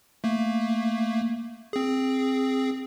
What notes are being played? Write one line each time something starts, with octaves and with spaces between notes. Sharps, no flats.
A3 A#3
C4 G#4